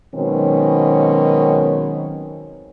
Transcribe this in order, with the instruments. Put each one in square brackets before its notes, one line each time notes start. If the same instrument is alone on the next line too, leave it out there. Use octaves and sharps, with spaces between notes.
[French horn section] B2 D#3 F#3 G#3 C4 C#4